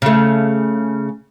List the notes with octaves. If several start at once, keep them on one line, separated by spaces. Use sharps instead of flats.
C#3 A3